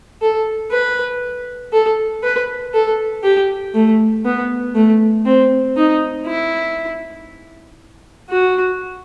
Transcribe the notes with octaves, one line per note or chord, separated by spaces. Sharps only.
A4
B4
A4
B4
A4
G4
A3
B3
A3
C4
D#4
E4
F#4